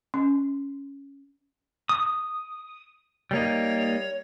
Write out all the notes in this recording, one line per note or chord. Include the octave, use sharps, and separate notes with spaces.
C#4
D#6
G3 A#3 D#4 C#5